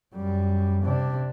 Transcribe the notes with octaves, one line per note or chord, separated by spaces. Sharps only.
F#2 G3
C3 D4